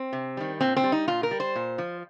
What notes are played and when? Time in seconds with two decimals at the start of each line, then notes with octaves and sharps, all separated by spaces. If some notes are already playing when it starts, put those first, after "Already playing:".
Already playing: C4
0.13 C3
0.37 D#3 G3
0.60 A#2 C4
0.77 C4
0.84 G3
0.92 D#4
1.08 A#2 F4
1.23 A#4
1.31 G3
1.40 C5
1.56 A#2
1.78 F3